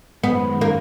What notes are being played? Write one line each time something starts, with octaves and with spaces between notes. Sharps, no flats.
F#2 D#3 G#3 B3
A#3